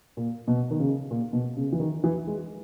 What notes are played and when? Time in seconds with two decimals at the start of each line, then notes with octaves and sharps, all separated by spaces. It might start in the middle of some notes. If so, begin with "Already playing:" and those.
0.17 A#2
0.48 B2
0.71 D#3
0.79 C#3
1.11 A#2
1.33 B2
1.57 C#3
1.72 E3
1.80 D#3
2.04 E3
2.27 G#3